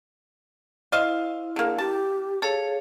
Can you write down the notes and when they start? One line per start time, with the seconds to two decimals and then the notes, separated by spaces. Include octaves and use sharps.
0.92 E4 C5 D#5 F5
1.56 D3 A#3 G#4
1.78 G4 A5
2.42 G#4 A4 C#5 F5